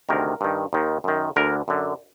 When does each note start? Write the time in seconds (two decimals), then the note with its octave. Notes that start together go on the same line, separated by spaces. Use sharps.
0.09 D2 C3 D#3 A#4
0.41 G2 D#3
0.73 D#2 D#3
1.04 F#2 D#3
1.36 D2 D3 A#4
1.68 F#2 D3